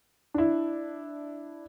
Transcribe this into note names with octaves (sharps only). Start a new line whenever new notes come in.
D4 E4